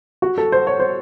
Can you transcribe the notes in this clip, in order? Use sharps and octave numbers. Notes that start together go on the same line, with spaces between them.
F#4
A4
C5
C#5
C5